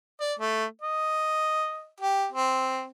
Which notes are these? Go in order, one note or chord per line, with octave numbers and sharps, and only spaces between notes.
D5
A3
D#5
G4
C4